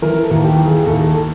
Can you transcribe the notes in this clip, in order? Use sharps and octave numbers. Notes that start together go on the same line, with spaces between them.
E3 A#4
A4
D#2
G4
E3
G#4
D#2 A4
A4